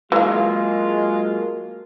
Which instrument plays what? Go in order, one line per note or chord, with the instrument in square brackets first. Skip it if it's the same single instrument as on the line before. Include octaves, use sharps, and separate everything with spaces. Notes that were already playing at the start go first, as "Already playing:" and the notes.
[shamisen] E3 F5 [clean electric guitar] F#3 A#3 [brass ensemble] G#3 F4